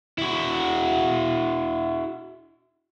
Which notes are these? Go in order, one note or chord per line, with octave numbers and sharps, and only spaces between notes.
E4 F#4